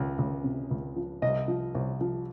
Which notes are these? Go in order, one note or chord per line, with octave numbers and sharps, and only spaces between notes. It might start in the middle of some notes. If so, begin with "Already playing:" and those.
Already playing: C#2
C#2
C3
C#2
F3
C2 D#5
F3
C2
F3